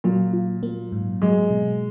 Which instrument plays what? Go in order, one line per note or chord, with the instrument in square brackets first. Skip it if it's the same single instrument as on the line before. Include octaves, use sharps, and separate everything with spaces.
[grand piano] A#2 [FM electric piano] F#3
[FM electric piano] F4
A#3
G#2
[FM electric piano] F#3 [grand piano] G#3
[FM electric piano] B2